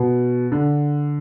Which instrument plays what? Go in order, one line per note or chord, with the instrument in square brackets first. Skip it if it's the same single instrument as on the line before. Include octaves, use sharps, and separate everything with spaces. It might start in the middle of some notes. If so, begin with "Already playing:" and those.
Already playing: [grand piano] B2
D3